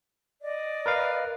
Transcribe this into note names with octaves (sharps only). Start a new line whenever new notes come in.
D5 D#5
A#4 B4 F5